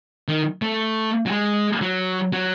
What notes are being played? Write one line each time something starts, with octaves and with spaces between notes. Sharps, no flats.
D#3
A3
F#3
G#3
F#3
F#3